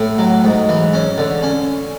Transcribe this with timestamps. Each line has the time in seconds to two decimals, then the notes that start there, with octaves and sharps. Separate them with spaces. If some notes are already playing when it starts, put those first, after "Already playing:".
Already playing: A2
0.18 F#3
0.44 G#2
0.69 E3
0.94 C#4
1.18 D3
1.43 C#4